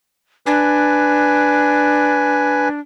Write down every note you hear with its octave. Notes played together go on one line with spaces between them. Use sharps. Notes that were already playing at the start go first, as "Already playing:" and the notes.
D4 B4 G#5